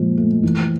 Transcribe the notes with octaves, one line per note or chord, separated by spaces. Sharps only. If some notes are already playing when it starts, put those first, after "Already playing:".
Already playing: A#2 F3 G#3
A3
E3